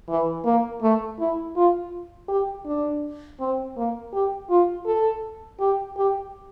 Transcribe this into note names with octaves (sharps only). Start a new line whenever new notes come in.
E3
A#3
A3
E4
F4
G4
D4
C4
A#3
G4
F4
A4
G4
G4